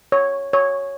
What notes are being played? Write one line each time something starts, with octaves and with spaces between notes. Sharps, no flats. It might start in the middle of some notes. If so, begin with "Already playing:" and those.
C#5
C#5